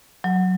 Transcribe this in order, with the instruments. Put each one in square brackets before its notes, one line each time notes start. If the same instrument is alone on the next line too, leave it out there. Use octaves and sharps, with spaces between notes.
[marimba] F#3